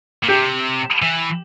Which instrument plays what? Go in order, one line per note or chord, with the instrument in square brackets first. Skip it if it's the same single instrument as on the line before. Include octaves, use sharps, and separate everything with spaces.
[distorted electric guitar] A#2
[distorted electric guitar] C3 [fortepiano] G4
[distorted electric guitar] E3